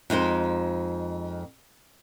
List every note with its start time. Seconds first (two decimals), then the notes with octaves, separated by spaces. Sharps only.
0.10 F2 G#3 D#4 C5